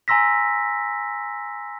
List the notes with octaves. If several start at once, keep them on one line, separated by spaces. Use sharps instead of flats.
G#5 A#5 C6 E6 A#6 B6